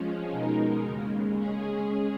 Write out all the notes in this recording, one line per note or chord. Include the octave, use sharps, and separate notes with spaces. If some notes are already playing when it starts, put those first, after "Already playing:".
Already playing: F3 G#3 C#4
B2 G#3 D#4 A#4
D#2 C#3 G#3
G#3 C#4 G#4